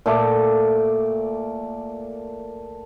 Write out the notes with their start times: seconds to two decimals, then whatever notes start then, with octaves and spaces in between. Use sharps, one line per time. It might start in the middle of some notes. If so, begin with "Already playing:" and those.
0.06 A#2 A3 D6